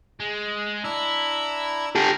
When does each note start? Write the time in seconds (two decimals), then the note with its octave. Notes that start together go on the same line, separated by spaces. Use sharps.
0.20 G#3
0.84 D4 E4 A#5 E6
1.96 G4 A4 A#4